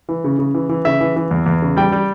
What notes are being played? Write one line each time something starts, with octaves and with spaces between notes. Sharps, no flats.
E3
C#3
C#3
E3
E3
C#3 E5
E3
E3
E2
E2
C#3
G3 G5
G3